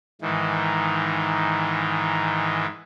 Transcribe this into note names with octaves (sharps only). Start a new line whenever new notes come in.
G#2 D#3 E3